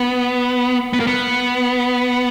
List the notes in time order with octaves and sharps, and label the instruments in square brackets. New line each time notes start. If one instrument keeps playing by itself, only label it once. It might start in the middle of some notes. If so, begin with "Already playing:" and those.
Already playing: [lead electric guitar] B3
B3
A#3
B3